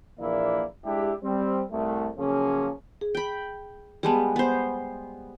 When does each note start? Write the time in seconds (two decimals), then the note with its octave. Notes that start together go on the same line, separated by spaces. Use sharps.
0.19 A#1 E3 A#3 E4 D5
0.85 G#3 D4 E4 G4
1.23 G3 C4
1.71 C2 A3
2.17 C#3 F3 F#3 A#3 C#4 G#4
3.01 G#4
3.15 G5 B5
4.03 G3 G#3 B3 G#4 A5
4.36 B3 C5